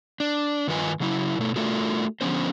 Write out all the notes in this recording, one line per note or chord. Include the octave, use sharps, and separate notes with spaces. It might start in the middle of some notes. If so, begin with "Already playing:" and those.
D4
G2 D#3 F4 B4 D#5 G#5
C#3 F#3 E4
B2 A3
A3 D4 F4 F#4 A4 A#4
D3 F3 B3 C#4 C5